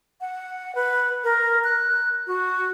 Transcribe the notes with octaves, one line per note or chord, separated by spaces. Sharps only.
F#5
B4
A#4
F#6
F#4